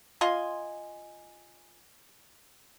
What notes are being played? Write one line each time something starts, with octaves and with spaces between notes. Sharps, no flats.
F4 D#5 G#5 C6